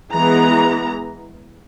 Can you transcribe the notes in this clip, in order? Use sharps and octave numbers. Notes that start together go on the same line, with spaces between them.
E3 G#3 B3 A#5